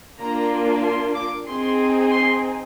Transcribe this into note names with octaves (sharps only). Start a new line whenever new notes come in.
A#3 D4 F4 A#5
C6
D6
C4 D#4 G#4 C6
C6